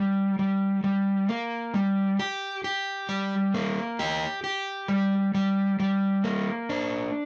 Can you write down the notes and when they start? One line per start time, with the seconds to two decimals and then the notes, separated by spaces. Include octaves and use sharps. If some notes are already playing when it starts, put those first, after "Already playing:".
Already playing: G3
0.39 G3
0.84 G3
1.29 A#3
1.74 G3
2.19 G4
2.64 G4
3.09 G3
3.54 A#3
3.99 G4
4.44 G4
4.88 G3
5.35 G3
5.80 G3
6.24 A#3
6.69 D4